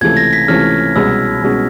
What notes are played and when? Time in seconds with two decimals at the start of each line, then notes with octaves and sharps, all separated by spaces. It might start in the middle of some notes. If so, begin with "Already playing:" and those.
0.01 C#2 C3 E3 A3 C#4 G#6
0.17 A#6
0.33 B6
0.48 C#2 C3 E3 A3 C#4 F6
0.95 C2 B2 G#3 C#4 E6
1.42 C2 B2 G#3 C#4